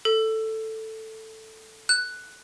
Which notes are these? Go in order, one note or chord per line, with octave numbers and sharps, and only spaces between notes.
A4
F#6